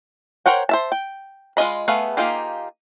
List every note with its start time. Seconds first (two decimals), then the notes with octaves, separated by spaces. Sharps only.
0.46 A#4 C5 C#5 F#5 G5
0.69 C5 E5 A5
0.92 G5
1.57 G#3 F4 G#4 D#5 B5
1.88 A3 B3 G#4 B4 F5
2.17 A#3 D#4 F4 G4 G#4